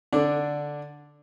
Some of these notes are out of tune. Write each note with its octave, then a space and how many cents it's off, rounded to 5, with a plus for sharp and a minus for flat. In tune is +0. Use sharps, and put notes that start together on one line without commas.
D3 +0 D4 +0